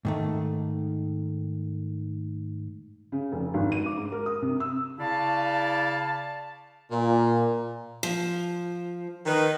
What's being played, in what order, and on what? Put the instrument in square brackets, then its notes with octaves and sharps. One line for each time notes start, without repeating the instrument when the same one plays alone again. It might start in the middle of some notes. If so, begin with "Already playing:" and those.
[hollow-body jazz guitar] G#2 D#3 A3
[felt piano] C#3
F1
G#1
D#7
D6
G#2
A#4
D#6
C3
E6
[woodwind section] C#3 E4 D5 F5 A5
[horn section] A#2
[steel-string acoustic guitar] F3
[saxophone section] D#3 B4